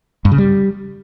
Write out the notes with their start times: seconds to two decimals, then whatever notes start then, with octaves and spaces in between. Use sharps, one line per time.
0.25 G2
0.32 C#3
0.38 G3